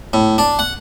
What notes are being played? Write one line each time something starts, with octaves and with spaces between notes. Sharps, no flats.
A2
D4
F#5